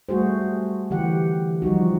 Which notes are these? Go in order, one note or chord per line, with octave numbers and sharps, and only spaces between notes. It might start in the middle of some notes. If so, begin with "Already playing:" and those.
G3 A3 F#4 G#4 C5
D3 E3 G4 F#5
F3 G3 D#4 F#4